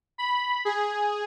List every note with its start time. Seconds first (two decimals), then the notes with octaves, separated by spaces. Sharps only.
0.18 B5
0.65 G#4